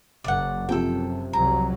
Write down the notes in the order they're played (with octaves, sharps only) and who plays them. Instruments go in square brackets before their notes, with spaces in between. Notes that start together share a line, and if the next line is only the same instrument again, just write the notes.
[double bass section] F#1 F#2 [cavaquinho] D5 F#5
[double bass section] F#2 [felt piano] C3 F3 [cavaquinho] A4 G5
[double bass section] C2 F2 F#3 [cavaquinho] A#5